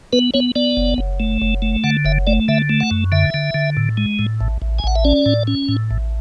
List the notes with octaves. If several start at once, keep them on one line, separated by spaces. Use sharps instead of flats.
B3 B4
B3 C#5
B3 D5
F#1
F#1
A3
F#1
A3
D3 F#5
F#1 E5
A3 D5
D3 E5
A3
F#5
F#2
D3 E5
D3
D3
A2
G#3
A2
A1
A1
G#5
A1 F#5
E5
C#4 D5
A2
C#4
A2
A1